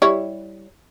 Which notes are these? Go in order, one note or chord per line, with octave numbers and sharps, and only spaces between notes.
G3 E4 C#5